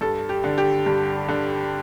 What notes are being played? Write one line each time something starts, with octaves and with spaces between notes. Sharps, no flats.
G2 A4
G4
D3
G4
G2
D3